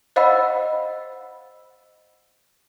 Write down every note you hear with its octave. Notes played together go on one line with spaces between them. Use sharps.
C5 D#5 F5 F#5 B5 E6